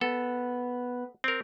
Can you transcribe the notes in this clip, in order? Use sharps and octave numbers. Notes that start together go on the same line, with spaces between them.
B3 A4
C4 A#4